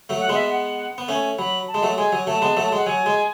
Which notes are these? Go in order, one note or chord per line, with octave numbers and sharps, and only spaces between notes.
F#3 A3
F#5
G#3 B3
E5
F#5
B3
A3 C#4 G#5
F#3 B5
A5
G#3
F#3 A3
G#3 G#5
F#3
F#3 A3 A5
G#3 B3
F#3 A3
G#3 F#5
F#3 G#5
G#3